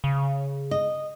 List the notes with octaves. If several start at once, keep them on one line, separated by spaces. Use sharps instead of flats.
C#3
D#5